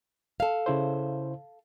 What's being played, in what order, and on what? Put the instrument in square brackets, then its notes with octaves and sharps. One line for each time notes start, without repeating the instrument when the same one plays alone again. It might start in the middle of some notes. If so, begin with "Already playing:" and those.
[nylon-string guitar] A4 F5
[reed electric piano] C#3 E4 C5